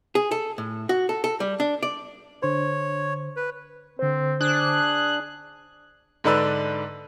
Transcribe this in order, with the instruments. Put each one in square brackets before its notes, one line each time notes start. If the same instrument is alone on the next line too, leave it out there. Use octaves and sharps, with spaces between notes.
[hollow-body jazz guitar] G#4
A4
A2
F#4
A4
A4
G3
D4
D5
[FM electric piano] D3 C5 [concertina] C#5
[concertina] B4
[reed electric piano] D3 C5 [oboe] C4
[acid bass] D4 [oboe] G#4 [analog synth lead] F#6
[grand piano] G#2 D3 D4 B4 E6